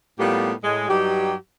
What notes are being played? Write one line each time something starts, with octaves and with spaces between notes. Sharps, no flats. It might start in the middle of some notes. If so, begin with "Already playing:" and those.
A2 G3 A#3 B3 F4 G4
A2 G#3
G2 F#3 D#4 G4